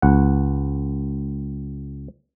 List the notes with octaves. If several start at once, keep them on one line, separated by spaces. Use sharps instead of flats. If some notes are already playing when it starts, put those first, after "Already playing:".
C#2 F#5